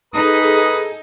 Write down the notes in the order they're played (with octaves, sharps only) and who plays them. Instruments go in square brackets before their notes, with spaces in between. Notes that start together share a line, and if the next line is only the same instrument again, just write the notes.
[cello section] D#4 [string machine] G#4 A4 [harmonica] B4 D#6